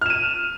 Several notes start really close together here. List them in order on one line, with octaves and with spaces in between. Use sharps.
F6 E7 D#7